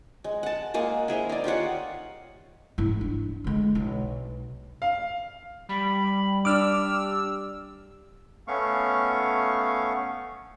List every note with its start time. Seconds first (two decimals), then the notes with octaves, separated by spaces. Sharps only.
0.24 G#3
0.43 F#5 A5
0.74 G#3 A#3 G#4 F#5
1.08 E4 G#4 C5 A#5
1.29 D#4 D5
1.44 F4 G4 C#5 F#5
2.78 G#2 E4
3.01 D4
3.44 D3 G#3
3.75 B1
4.82 F5
5.69 G3 B5
6.45 D4 D6 E6 F6
8.48 A3 B3 C#4 F5 C#6